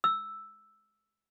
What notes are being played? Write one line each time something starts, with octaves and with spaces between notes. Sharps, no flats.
E6